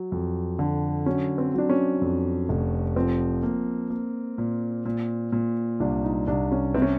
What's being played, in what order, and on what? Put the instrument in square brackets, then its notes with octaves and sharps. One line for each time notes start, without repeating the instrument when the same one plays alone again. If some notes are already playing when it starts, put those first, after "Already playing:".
Already playing: [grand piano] F#3
F2
D3
[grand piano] F#3 [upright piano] C#4
[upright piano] C4
[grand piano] F#3 [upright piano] D4
[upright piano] C#4
[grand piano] F2
F1
[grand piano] F3 [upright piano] C4
[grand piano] A#3
A#3
A#2
A#2
A#2
[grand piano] C2 [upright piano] D4
[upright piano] D#4
[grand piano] C2 [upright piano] D4
[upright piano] C#4
[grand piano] C3 [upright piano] C4
[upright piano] C#4